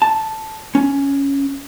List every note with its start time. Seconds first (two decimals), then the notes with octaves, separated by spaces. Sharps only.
0.02 A5
0.75 C#4